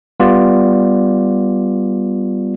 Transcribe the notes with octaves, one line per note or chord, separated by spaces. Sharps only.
G3 B3 F4 D5